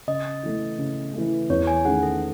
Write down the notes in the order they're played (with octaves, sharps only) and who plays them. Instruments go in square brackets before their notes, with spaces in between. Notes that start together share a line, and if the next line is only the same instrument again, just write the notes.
[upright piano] C#3 [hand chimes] D#5
[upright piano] E3 A3
C#3
E3 A3
[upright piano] E2 [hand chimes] C#5
[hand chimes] G#5
[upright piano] D#3 A3 C#4 G#4 [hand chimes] F#5
[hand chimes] A4